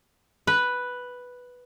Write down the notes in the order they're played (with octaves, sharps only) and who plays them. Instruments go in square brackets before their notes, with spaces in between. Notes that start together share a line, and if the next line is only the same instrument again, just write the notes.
[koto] B4